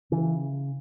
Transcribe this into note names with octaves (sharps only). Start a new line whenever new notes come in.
C#3 E3